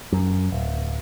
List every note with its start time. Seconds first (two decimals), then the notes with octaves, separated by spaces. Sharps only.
0.12 F#2
0.52 D1